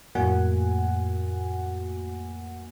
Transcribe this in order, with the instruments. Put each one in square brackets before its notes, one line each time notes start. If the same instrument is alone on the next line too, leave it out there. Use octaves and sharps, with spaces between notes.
[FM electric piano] F2 A2 A#3 F#4 F#5 G#5